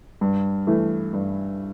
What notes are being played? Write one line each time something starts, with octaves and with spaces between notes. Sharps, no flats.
G2
E3 A3
G2